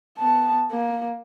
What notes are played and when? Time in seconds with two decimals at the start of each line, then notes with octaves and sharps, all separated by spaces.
0.18 B3 A5
0.71 A#3